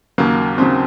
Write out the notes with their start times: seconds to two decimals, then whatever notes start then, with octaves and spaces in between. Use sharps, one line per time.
0.18 D#2 C#3 F#3 A#3
0.58 D#2 C#3 F#3 C4